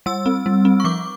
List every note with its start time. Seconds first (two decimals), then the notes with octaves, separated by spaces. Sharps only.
0.06 G3 E6
0.26 C4
0.46 G3
0.65 C4
0.80 C#6
0.84 F3 D6